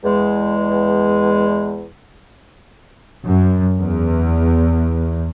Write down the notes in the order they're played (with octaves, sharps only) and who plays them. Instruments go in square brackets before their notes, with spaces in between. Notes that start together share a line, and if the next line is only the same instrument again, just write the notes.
[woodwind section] E2 G#3
[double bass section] F#2
E2